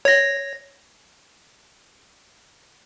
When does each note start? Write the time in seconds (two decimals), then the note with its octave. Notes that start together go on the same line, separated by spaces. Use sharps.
0.05 C#5 A#6